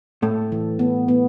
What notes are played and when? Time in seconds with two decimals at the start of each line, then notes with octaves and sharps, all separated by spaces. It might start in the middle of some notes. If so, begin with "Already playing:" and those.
0.22 A2 A4
0.52 E3
0.79 B3
1.08 B3